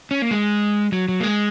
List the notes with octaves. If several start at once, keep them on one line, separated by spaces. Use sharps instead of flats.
C#4
A#3
G#3
F#3
F#3
A#3
G#3